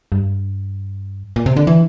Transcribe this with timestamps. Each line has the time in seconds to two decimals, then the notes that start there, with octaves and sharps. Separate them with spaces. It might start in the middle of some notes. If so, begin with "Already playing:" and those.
0.12 G2
1.36 A#2
1.46 C3
1.57 D3
1.67 E3